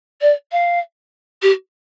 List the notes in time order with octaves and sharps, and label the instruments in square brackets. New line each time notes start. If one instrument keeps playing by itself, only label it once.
[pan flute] D5
F5
G4